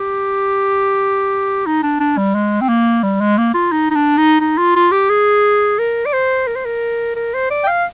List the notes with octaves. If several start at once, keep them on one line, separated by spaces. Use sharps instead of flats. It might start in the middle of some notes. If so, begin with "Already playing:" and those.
Already playing: G4
D#4
D4
D4
G3
G#3
C4
A#3
G3
G#3
A#3
F4
D#4
D#4
D4
D#4
D#4
F4
F4
G4
G#4
A#4
D5
C5
A#4
C5
A#4
A#4
C5
D5
G5
F5